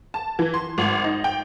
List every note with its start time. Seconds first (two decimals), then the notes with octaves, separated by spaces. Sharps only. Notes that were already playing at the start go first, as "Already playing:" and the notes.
0.14 A5
0.39 E3
0.54 C6
0.78 G#1
1.04 D#4
1.24 G5